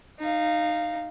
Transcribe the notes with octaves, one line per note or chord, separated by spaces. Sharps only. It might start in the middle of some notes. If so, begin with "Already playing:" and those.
D#4 F5